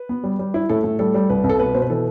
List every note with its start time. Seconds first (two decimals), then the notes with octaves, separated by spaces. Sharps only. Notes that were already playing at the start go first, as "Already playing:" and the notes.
Already playing: B4
0.09 B3
0.24 G3
0.39 G3
0.54 E4
0.69 A2 A4
0.84 A2
0.99 G3 A4
1.14 G3
1.30 C2 B4
1.44 C2
1.49 A4
1.59 B2 B4
1.75 B2 C5
1.82 B4
1.90 E3 A4